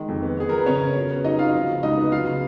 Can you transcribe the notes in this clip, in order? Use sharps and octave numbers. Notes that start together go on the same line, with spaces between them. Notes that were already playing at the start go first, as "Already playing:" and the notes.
Already playing: D#3 G#3
F2
B3
B3 G#4
F3 A#4
B4
C#3 C#4 C#5
C#3
F#4
B3
F#3 D#4 D#5
F#3 F4 F5
F3
C#3
C#2 D#4 D#5
B3
F#3 F4 F5
C#3